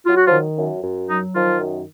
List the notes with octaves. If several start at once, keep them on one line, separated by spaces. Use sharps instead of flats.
F#3 F4
F#4
F3 F4
D#3
F#2
F#2
F#3 D#4
D#3 F3 F4
F#2